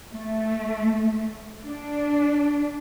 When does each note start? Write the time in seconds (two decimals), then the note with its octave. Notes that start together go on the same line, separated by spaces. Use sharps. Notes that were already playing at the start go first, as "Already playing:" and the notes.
0.12 A3
1.64 D4